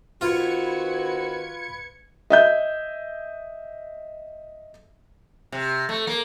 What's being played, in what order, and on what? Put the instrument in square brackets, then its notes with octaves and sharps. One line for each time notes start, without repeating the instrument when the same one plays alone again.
[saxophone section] D#3 C4 F#4 [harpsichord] F4 [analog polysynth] B4 G#6 C#7
[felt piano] D#5 E5 G6
[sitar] C3
A3
A#3